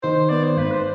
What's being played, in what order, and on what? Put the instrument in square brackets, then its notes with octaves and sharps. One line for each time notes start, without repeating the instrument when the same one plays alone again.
[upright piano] D#3 [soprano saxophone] C5
[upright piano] B3 [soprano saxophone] D5
[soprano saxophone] C5
[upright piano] G#1 [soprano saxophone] B4
[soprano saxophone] C5